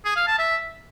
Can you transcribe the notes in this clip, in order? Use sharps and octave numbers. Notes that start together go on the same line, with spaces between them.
G#4
F5
A5
E5